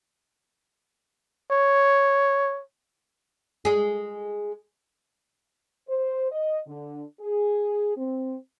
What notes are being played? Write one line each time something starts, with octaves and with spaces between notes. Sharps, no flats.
C#5
G#3 G#4
C5
D#5
D3
G#4
C4